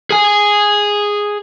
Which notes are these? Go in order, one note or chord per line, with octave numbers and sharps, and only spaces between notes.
G#4 G#5